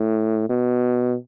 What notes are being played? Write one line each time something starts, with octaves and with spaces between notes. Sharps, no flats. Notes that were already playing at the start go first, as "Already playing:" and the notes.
Already playing: A2
B2